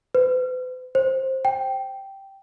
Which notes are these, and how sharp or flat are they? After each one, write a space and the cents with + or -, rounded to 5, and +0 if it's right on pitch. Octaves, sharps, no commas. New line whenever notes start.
B4 +45
C5 +15
G5 -5